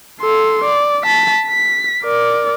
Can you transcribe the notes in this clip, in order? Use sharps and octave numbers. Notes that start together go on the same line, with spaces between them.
A4 C6
D5
A5 B6
B6
A#4 D5